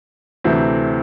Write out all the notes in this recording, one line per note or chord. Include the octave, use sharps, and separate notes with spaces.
D2 C3 E3 A3 C4